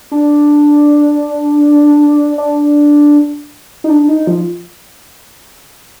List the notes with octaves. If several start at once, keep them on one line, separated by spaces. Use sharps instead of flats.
D4
D4
D#4
D4
D#4
F3